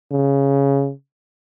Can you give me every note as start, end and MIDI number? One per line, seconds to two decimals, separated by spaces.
0.12 0.91 49